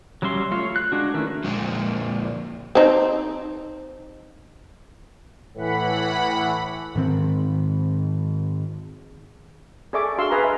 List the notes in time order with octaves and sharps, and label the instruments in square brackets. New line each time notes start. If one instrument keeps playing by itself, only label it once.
[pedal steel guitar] F#3 G3 C#4 E5 C6
A3 F4 C#5 F5
F#6
G#3 D4 F#4
D#3 E3 A3 C#4 E4
[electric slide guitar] F2 A#2 G#3
[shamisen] C4 D#4
[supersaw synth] A2 E3 F#5 B5
[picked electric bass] G#2 D#3 C4
[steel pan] G#4 A4 D5 E5 C#6 D6
D4 F#4 G#4 F5 C6 E6
G#4 B4 F5 G#5 A#5
D#5 E5 B5